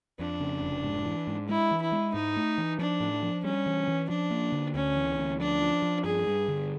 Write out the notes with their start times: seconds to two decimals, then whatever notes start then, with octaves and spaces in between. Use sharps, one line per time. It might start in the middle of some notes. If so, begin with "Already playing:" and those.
0.19 F2 D4
0.40 C#3
0.62 F1
0.84 G#2
1.06 E3
1.27 G#2
1.48 G#3 E4
1.71 E3
1.82 E4
1.92 G#3
2.14 G#2 D#4
2.36 A3
2.58 E3
2.79 F3 D4
3.00 A2
3.23 F3
3.44 G3 C#4
3.66 E3
3.88 E3
4.09 F3 D4
4.31 A#3
4.52 D3
4.74 D2 C#4
4.96 E3
5.18 D2
5.39 F3 D4
5.62 F3
5.82 F3
6.04 G2 G#4
6.27 G2
6.48 D3